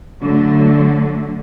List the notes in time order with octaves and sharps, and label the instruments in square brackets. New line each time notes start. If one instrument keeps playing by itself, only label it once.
[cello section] D3 F#3 A3